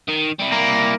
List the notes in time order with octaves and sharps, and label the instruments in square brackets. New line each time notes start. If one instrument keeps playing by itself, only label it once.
[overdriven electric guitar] D#3
G3 E4
[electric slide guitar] A#3